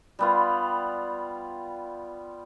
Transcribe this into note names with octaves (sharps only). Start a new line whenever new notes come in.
G3 B3 F4